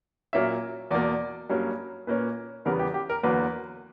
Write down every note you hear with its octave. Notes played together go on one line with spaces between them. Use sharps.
A#2 F#3 A#3 C#4 E5
E2 B2 A#3 D5
G2 F#3 A#3 C#4
A#2 A#3 C#4 B4
E2 C#3 E3 G3 B3 A#4
G4
G4
A#4
E2 D3 F#3 A#3 B4